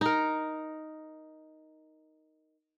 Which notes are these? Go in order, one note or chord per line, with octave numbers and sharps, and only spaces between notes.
D#4 A#4